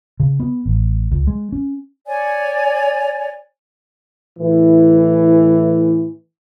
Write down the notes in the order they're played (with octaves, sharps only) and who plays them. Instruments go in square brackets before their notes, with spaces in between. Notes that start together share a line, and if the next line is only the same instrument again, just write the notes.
[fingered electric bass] C#3
B3
A1
C#2
G#3
C#4
[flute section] C#5 D5 G#5
[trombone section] A2 E3